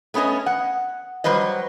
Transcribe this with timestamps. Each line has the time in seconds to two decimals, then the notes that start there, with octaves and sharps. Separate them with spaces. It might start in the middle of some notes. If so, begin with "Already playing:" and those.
0.14 A3 B3 C#4 A4 D#5
0.46 F#5
1.24 F#3 G3 B4 C5 D#5